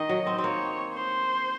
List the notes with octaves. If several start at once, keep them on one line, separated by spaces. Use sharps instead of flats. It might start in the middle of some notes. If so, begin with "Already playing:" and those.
Already playing: D#3 D#5
F#3
C4
C4
A#3 C#5
C5